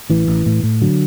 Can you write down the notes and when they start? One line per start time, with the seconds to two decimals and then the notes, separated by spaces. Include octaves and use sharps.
0.10 A1 E3
0.28 A1
0.46 A2
0.63 A2
0.81 D3 F#3